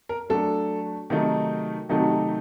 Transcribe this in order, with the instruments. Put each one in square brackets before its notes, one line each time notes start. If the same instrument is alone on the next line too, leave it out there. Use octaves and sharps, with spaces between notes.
[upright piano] A#4
[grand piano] F#3 A3 D4 [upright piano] A4
[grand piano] C3 D#3 F#3 A3 D#4
[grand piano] C3 D#3 F#3 A3 D#4 [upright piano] G4
[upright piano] F#4
G4